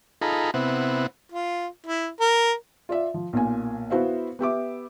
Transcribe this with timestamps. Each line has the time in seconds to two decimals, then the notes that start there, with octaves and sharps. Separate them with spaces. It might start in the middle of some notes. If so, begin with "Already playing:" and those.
0.22 D#4 F4 G#4 A4 A#5 B5
0.54 C3 B3 C4 E4 F#5
1.32 F4
1.86 E4
2.21 A#4
2.89 F4 D5 E5
3.14 F3
3.33 B1 A#2 G#5
3.90 B3 E4 F#4 C5 E5 F5
4.39 B3 G4 E5 D6